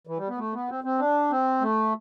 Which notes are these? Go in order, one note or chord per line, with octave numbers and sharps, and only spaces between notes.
E3
G3
B3
A3
B3
C4
C4
D4
C4
A3